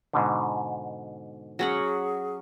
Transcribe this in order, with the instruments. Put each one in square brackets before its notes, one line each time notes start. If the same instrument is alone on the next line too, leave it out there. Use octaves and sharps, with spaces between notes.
[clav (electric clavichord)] G#2 B2 D3
[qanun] F#3 C#4 F#5 [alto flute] G#4